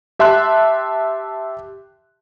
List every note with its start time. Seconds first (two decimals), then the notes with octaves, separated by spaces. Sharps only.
0.19 G4 E5 A5 C6 F#6